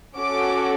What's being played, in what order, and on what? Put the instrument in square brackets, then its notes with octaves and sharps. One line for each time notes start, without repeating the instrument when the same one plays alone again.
[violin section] C#4 F#4 A4 D6